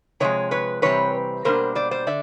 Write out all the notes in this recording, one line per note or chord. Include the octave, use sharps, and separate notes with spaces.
C3 F3 G#3 C#5 D#5
B4 C#5
C3 E3 G3 C4 B4 C#5
B2 G3 A#3 D4 A#4 C5
C5 D5
C5 D5
D3 D5 E5